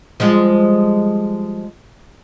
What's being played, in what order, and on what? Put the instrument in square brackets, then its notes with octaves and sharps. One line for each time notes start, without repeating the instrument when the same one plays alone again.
[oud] F3 G3 G#3